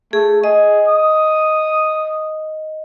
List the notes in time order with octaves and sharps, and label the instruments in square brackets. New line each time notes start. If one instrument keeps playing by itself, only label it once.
[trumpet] A3 [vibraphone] G#4
[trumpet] G#4 [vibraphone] D#5
[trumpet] D#6